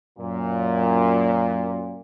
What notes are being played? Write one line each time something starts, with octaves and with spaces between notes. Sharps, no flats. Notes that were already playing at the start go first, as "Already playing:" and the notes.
F#2 A#2